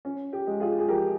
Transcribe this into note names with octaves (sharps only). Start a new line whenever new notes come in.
C#4
G4
G#3
F4 G#4
G#4
F3 G4 A#4